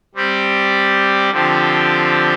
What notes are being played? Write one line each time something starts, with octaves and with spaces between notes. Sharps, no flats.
G3 C4 G4 D5
D3 F3 C4 G4